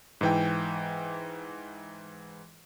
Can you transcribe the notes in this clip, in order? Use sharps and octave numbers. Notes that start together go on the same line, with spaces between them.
G#2 E3 G5